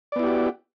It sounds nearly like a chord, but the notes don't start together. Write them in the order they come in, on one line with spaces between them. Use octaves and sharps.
D5 B3 E4 G4 F#4